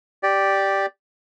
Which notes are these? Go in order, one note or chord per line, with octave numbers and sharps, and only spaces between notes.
G4 D5